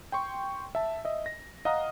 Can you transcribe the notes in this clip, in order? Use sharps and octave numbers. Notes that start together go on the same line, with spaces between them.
G5 C6 C#6
E5 A5
D#5 E5
A#6
D#5 F5 F#5 A#5 D#6